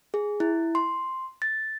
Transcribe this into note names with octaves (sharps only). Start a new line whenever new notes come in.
G#4
E4
C6
A6